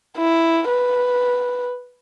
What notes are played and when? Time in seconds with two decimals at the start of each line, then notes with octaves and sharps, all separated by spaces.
0.17 E4
0.69 B4